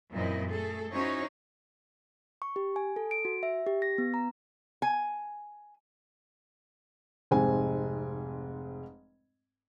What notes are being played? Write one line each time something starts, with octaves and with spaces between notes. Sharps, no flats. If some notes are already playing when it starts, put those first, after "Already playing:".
F#2 A#2 E3 C4 E4 D#5
A3 G#4 A4
C#4 D#4 E4 F#4 C5 C#5
C#6
G4
G#5
A4
D7
F#4
E5
G4
A#6
B3
A#5
G#5
F1 G#2 G#3 C4 C5 G#5